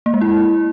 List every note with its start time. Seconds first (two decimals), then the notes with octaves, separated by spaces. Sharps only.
0.06 A#3
0.14 G#3
0.21 E4